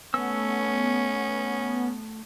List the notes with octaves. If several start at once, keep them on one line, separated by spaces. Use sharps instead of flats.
A3 B3 C#4 E6